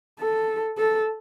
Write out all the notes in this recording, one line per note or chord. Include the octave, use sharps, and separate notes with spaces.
A4
A4